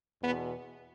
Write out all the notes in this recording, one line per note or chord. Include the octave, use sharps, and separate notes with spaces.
E2 B2 B3